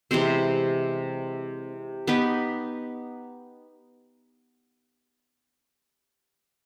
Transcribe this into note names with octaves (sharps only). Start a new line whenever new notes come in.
C3 E3 G#3 C4
B3 D#4 G4 B4